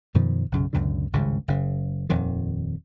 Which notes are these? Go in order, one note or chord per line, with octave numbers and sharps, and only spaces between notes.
F#2 B2 D#3 F3
B1 F#2 C#3
C#2 F#2 B2 D3
G#1 C#2 G2 C#3
F#1 C#3
D#1 F2 D#3